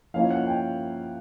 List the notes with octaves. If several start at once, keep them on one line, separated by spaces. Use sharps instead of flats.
F3 A#3 C#4 E4 F5
F#5
G5